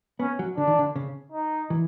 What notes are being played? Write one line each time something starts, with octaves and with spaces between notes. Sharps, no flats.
B3 C#4
F#3
D3 D4
D#3
D3
C#3
D#4
E3